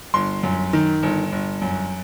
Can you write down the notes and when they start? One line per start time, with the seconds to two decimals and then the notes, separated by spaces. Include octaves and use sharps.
0.14 G1 C6
0.43 F#2
0.73 D#3
1.03 G1
1.32 G1
1.62 F#2